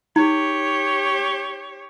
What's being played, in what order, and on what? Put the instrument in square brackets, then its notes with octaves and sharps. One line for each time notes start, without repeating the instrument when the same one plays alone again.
[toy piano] D#4 [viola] G4 C#5